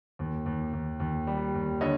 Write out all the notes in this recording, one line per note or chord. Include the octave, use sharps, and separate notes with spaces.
D#2
D#2
D#2
D#2
G3
D#2
D3 C#5 D#5